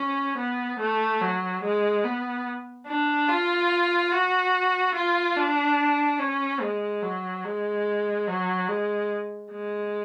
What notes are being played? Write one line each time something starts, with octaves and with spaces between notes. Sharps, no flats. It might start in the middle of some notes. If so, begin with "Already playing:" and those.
Already playing: C#4
B3
A3
F#3
G#3
B3
D4
F4
F#4
F4
D4
C#4
G#3
F#3
G#3
F#3
G#3
G#3